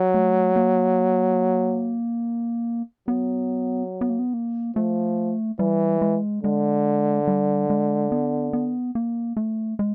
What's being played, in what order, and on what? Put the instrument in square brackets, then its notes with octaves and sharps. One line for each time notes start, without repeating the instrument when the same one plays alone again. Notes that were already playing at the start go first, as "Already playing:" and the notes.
Already playing: [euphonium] F#3
[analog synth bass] A3
A#3
[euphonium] F#3 [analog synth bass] B3
[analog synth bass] B3
A#3
B3
A#3
[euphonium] F3 [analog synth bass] A3
[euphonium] E3 [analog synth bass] G3
[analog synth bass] G#3
[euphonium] D3 [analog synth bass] G#3
[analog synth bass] G3
G#3
B3
B3
A#3
A3
G#3